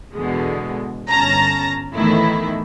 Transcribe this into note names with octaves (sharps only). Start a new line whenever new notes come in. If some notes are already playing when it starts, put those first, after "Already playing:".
E2 B2 D3 G#3
G1 C#4 A5 A#5 A#6
E2 A2 D#3 E3 A3 E4